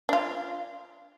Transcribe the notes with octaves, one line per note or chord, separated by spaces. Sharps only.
D4 F4